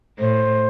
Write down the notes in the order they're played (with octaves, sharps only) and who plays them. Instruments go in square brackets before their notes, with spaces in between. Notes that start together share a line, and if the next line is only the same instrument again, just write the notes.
[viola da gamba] A2 [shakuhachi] C5